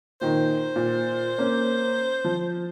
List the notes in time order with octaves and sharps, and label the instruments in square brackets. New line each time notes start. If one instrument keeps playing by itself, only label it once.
[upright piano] A#2 D#3 D#4 [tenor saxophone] C5
[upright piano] A#2
A#3 C#4
F3